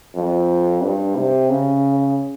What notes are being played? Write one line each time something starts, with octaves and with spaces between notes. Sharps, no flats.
F2
G2
C3
C#3